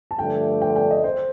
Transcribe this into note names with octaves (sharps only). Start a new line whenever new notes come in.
A5
G2 D3 F3 A3 D4 G5
G5
G5
D#5
C5